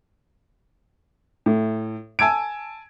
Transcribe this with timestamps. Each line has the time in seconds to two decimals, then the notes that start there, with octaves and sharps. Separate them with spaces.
1.46 A2
2.19 G#5 A5 E6 G#6 D7